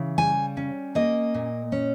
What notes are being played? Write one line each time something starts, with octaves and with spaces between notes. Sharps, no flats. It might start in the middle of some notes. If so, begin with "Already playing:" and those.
Already playing: C#3 E3
G3 G#5
C#4
A#3 D#5
A#2
C#4